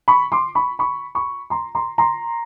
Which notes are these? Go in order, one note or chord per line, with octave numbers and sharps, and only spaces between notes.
B5 C#6
C6 D6
B5 C#6
B5 C#6
B5 C#6
A#5 C6
A#5 C6
A#5 C6